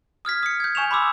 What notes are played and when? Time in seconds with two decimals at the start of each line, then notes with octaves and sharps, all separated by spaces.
0.25 D#6 F6 G#6 B6
0.43 D#6 C#7
0.60 G6 G#6
0.75 G#5 C#6 E7 F7
0.91 B5 C6 D6 E6